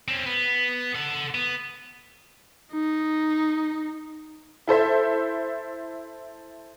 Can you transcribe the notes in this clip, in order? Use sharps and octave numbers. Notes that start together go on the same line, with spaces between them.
C4 C#4
B3
A4 F#5
B3
D#4
E4 A4 C5 E5